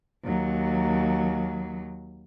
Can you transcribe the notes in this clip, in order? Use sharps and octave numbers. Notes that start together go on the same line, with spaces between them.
D#2 F#3